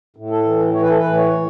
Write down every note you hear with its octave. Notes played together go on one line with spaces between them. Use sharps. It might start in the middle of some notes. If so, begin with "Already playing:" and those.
A2
A4
E3
E3 C#5
B4
A4
B4
A2
C#5
A2